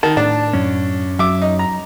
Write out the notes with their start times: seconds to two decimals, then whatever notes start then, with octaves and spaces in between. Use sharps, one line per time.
0.03 D#3 A5
0.17 A2 D4
0.53 F#2 C#4
1.19 F#3 E5 D6
1.42 D#4
1.59 A#5